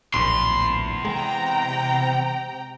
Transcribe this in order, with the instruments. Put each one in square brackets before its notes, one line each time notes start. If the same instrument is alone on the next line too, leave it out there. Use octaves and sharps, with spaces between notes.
[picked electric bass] D1 A#1 [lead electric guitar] E2 [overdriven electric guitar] C6
[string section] C3 G5 A#5 [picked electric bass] G#3